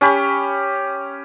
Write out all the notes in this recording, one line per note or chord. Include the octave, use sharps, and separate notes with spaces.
C#4 G4 B5